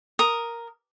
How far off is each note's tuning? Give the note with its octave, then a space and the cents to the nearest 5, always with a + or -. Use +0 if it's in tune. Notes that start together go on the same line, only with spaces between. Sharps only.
A#4 +0 D#6 +0